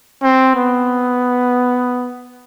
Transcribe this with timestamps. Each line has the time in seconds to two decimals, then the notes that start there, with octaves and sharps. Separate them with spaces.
0.23 C4
0.56 B3